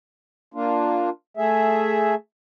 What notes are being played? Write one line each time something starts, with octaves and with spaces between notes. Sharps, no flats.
A#3 D4 F4
A3 G#4 E5